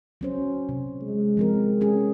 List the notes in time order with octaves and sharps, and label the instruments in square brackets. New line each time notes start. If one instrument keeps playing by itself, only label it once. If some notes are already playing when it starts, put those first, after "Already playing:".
[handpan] F#3 C#4 C5
C3
[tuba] G#3
[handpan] F3 C4 A#4
C#4 G#4